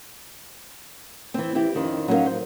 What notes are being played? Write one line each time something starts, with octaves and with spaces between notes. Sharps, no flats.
E3 C4
C4 E4 G4
F2 D#3 C#4
F#3 C#4 D#4 E4 A#4 F5
C5